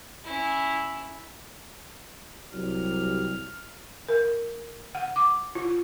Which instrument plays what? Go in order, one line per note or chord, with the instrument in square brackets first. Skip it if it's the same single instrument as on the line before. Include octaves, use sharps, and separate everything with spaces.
[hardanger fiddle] C#4 E4
[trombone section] C2 F#3 G3 [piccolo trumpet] F6
[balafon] A#4
F#5
D6
F4